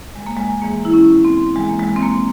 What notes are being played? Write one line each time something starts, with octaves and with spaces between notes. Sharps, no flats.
G#3
A#3
G#3
G#2 E3 A#3
E4
C#4
C4
G#2 E3 G#3
A#3
G#3
C4
A#3